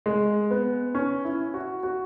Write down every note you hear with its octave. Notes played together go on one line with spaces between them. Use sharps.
G#3
B3
C#4
E4
F#4
F#4